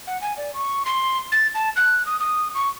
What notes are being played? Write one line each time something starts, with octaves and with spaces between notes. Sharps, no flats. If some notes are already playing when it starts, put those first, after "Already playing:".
F#5
G#5
D5
C#6
C6
A6
A5
F#6
D#6
D#6
C#6